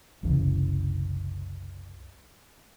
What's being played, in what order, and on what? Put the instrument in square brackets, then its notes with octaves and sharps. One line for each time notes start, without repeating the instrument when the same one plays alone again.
[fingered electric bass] F#1 C2 C#3 E3